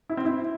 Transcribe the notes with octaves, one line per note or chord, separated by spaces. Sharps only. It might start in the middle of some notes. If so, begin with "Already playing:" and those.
E4
C4
E4